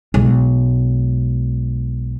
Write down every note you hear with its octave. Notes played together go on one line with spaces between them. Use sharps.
B1 G#3